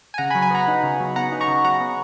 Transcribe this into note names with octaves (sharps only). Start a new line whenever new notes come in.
G#5
C#3 F#5 A#5
G#5 B5
F#3
G#5 B5
B3 F#5 A#5
D#4
C#3
F#3
B3 F#5 A#5
D#4
A#5 C#6
C#3
F#3 F#5 A#5
B3